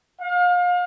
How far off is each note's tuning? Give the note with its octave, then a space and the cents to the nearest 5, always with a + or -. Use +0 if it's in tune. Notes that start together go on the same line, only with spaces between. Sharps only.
F5 +35